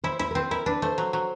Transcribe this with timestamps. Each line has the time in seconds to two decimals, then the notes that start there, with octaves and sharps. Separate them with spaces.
0.04 E4 C5
0.19 E4 C5
0.31 A#4
0.35 C4 B4
0.51 E4 A#4
0.66 D4 B4
0.82 A3 C5
0.98 F#3
1.13 F#3